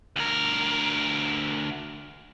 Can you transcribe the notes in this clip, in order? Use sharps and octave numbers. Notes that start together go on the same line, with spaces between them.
D2 A#4